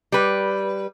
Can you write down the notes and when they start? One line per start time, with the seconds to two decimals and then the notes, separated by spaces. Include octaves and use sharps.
0.12 G3 B4